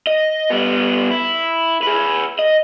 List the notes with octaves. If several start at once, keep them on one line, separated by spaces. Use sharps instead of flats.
D#5
G3 B3
E4
G#4 B4
D#5